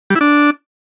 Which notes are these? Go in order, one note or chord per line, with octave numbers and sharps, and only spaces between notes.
G3
E4
D4